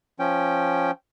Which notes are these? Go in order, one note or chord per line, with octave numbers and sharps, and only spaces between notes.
F3 C#4 G5